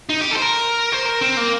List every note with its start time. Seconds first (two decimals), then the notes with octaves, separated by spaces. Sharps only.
0.09 D#4
0.21 G4
0.31 A4
0.36 C5
0.42 A#4
0.92 C5
1.05 A#4
1.21 C4
1.37 A#3